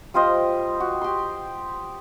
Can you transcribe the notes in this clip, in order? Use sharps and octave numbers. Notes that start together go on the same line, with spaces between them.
G3 F4 C5 D#5
F#4
G4 C6